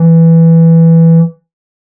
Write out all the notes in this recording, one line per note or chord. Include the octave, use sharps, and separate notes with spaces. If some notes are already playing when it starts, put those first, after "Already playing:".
Already playing: E3